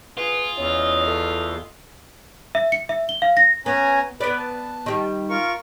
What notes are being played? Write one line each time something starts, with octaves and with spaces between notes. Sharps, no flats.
B3 F4 G#4
E2 C#4 D#5
A3
E5
C#7
E5
G7
F5
A#6
B3 C#4 G#5 A#5
B3 B4 D5
A5
D#3 G3
F4 A#4 C#6